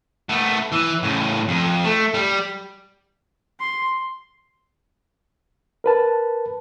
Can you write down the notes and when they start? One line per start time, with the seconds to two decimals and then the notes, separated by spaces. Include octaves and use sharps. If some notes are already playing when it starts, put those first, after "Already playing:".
0.29 A3 B3
0.72 E3
1.03 A2 C#3
1.48 F2
1.84 A3
2.14 G3
3.59 C6
5.84 A#4 B4 A5